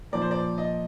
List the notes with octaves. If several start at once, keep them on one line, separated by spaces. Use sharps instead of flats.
A#2 F3 D5
C5
D5
D#5